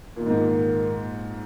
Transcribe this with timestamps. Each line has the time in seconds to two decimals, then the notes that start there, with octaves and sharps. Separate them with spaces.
0.15 A#2 D#3 A#3 D#4 A#4
0.26 G#2
0.36 A#2